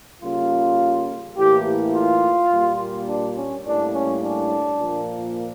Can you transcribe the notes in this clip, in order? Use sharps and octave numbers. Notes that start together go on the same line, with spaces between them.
C#3 G3 A#3 F4
A2 E3 A#3 G4
F4
A#2 G3 A#3
D4
C#4
A2 G3 A#3 D4
C#4
D4
A#2 F3 A#3